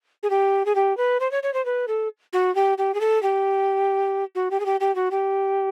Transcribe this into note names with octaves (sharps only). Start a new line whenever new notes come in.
G#4
G4
G#4
G4
B4
C5
C#5
C#5
C5
B4
A4
F#4
G4
G4
G#4
A4
G4
F#4
G4
G#4
G4
G4
F#4
G4